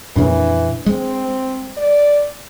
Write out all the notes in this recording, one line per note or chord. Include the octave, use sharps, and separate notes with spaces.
F2 A#2 C#3 E3 D4
G#3 C4
D5